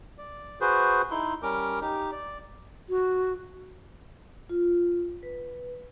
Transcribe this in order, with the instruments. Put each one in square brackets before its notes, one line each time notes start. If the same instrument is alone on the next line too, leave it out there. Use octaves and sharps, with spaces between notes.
[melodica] D5
F#4 G#4 B4 C5
D#4 E4 C6
G3 C#4 A#4 D6
D#4 G4
D5
[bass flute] F#4
[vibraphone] F4
B4